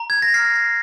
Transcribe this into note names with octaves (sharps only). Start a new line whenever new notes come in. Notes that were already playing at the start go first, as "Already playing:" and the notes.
Already playing: A#5
G#6
A#6
F6 C7